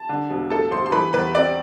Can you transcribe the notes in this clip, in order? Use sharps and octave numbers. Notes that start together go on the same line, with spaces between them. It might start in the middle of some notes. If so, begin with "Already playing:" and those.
Already playing: A5
D3
E1
A2 A4 A5
A1 C5 C6
C6
E3 B4 B5
E2 B4 B5
C4 D5 D6